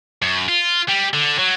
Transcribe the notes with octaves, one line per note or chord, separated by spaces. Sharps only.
F#2
F4
G3
D3
F#3